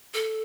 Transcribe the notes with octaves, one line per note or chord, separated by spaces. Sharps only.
A4